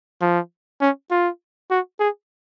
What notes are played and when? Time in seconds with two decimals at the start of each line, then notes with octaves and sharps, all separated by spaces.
0.22 F3
0.81 C#4
1.11 F4
1.71 F#4
2.00 G#4